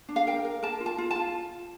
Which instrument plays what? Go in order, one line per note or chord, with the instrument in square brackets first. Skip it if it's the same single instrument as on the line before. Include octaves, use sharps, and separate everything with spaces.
[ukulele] D4
F5
A#4 G5
A#4
A#4 A5
F4
A5
F4
A5
F4